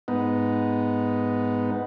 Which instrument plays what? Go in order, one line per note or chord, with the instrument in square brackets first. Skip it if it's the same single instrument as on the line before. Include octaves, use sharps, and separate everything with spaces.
[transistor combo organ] G#2 B3 D#4